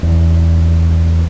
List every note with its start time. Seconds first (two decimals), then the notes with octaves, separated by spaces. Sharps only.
0.03 E2